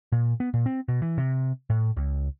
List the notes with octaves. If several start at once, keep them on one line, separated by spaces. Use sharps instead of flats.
A#2
B3
A#2
C4
B2
E3
C3
A2
C#2